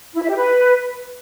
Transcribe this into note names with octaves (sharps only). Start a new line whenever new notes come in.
E4
E5
G4
B4